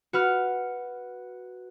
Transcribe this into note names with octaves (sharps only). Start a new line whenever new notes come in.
F#4 B4 F6